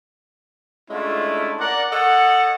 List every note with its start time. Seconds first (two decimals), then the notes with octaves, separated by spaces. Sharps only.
0.90 G#3 A3 C#4 D4 E4 F4
1.60 A#4 D5 F#5
1.91 A4 C#5 D#5 F#5